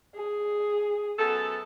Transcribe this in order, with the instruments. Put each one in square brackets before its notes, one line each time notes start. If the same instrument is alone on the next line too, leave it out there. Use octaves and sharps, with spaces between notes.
[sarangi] G#4
[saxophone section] F#2 B3 A4